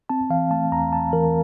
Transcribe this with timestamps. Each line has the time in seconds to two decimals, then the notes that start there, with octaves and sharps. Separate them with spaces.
0.09 C4 A5
0.30 E3 F5
0.51 A3 A5
0.72 E2 A#5
0.93 C4 A5
1.13 E3 A#4